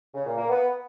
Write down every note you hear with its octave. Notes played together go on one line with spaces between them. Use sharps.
C#3
A#2
A#3
B3